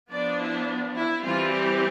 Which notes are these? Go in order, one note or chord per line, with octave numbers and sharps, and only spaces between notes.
F3 B3 D4 D5
E4
E4
E3 G3 C4 F4
G4